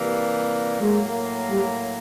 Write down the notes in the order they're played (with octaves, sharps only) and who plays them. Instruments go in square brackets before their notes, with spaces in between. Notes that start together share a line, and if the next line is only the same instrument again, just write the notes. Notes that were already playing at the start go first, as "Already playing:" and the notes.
Already playing: [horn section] C3 E3 G3 A#3
[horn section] A2 F#3 A#3 [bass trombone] G#3
[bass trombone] G3